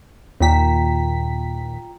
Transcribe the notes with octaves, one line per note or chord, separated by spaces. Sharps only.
D#2 A#2 F4 G5 A#5 B6